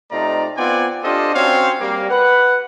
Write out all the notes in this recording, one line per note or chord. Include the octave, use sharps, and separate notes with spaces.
C3 A3 D#4 F4 D5 A#5
B3 C4 F4 D5 F#5 G#5
D4 F4 G4 A4 C5 D#5
C4 C#4 F#4 C5 C#5 F5
G3 A#3
B4 F#5